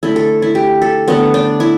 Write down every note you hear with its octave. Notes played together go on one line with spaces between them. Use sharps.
D3 A3 E4
A4
E4
G4
A4
D3 A3 B3
D4
E4